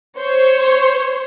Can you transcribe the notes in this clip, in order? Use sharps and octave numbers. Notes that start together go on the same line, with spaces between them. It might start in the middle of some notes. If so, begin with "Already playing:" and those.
C5 C#5